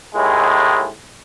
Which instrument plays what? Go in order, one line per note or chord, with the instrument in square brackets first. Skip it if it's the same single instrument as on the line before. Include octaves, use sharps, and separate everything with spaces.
[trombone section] D#2 A2 G#3